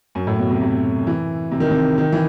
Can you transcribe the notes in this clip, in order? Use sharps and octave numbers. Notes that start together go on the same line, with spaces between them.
F#2
A2
B2
C3
C3
E3
C3
D#3
C3
D#3
E3